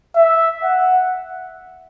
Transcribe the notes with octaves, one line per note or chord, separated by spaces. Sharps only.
E5
F#5